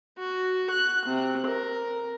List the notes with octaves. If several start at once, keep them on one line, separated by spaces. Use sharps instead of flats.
F#4
F#6
C3
A#4